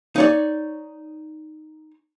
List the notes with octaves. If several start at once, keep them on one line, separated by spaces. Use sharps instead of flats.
D#4 C#5 D5